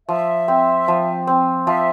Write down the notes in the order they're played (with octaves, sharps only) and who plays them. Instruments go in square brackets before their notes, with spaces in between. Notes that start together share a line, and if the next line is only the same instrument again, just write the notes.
[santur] F3 [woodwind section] E5
[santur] C4
F3
C4
[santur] F3 [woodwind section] E5